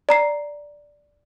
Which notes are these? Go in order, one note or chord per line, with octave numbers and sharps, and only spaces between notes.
D5 A#5 C7